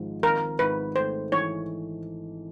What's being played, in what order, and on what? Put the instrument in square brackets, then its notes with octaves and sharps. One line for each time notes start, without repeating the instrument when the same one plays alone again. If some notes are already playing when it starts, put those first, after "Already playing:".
Already playing: [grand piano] G#1 G#2 F3 G#3
[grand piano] G#1 [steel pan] A#4
[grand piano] G#2 [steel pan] B4
[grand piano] A3 [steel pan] C5
[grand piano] E3 [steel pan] C#5